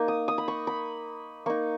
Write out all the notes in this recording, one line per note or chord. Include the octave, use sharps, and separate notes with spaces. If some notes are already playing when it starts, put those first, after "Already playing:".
Already playing: A#3 D#4
D#6
D#6
B5
C#6
B5
A#3 D#4 C#6